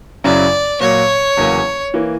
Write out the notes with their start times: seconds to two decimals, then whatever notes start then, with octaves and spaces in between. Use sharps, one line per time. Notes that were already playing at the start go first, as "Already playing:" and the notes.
0.24 F#2 C#3 F#3 C#4 E4 D5
0.80 A#2 F#3 A#3 C#5
1.37 E2 C#3 F#3 A#3 C#4
1.94 E3 A#3